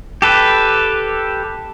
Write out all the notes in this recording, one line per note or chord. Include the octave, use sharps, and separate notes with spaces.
G4 A4 B4